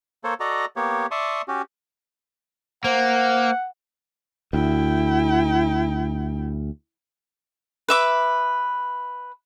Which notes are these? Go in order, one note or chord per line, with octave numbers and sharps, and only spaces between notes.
A#3 A4 C5 C#5
F#4 A4 D5 D#5 A#5
A#3 B3 G4 C#5
D5 E5 A5 C6 C#6 D#6
C#4 F#4 G4
A#3 C5 F#5
D2 E4 G5
B4 E5 D6